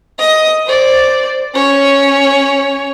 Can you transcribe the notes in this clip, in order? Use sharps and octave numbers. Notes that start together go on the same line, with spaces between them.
D#5 D#6
C5 D5
C#4 C#5